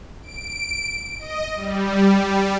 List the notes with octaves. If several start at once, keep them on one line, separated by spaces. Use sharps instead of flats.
D7
D#5
G3